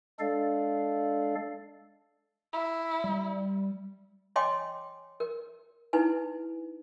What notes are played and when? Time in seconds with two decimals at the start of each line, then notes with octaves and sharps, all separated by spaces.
0.20 G#3 D4 A4 D5 F5
2.53 E4
3.04 G3
4.36 C#5 D#5 G5 G#5 C6 D6
5.20 A#4
5.93 D#4 E4 B4 G#5